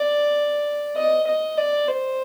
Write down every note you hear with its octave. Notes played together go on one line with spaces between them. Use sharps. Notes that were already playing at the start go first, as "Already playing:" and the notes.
Already playing: D5
D#5
D#5
D5
C5